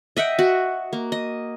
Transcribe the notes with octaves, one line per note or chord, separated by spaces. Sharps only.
D#5 E5 F#5 G5
F#4
A#3
D#5